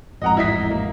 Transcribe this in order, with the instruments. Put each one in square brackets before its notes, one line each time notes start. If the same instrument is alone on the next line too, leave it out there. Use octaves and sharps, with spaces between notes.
[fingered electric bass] A1 F2 G#2 [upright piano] D#5 F#5 A#5
[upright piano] E4 D#5 B6
A#3